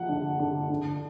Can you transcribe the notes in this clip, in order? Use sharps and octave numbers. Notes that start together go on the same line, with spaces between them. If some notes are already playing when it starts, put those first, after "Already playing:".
Already playing: F3 F#5
D3
D3
D3